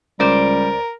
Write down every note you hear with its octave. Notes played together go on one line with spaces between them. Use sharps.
C#2 G3 A#4 C5 D5